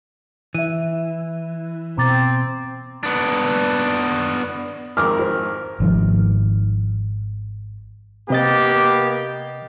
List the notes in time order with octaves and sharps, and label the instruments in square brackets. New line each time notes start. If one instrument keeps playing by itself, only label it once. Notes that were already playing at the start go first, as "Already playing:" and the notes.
[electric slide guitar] E3 [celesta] E5 D#7
[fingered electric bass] B2 [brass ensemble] C4 [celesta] A#5 D6 A6
[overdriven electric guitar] B3 D4
[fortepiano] G#1 F2 A#4 [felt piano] D6 F6
[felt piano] C5
[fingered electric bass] G#1 D#3 F3
[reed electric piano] C3 D#5 A6 [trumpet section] A#3 B3 G4